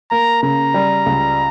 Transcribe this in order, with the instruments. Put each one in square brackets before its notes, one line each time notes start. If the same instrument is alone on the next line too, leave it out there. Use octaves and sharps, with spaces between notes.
[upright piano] A#3 [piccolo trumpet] A#5
[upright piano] C#3 [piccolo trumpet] A#5
[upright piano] G3
C#2